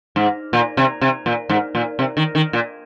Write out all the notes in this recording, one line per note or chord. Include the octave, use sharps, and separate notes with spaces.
G#2
A#2
C3
C3
A#2
G#2
A#2
C3
D#3
D#3
A#2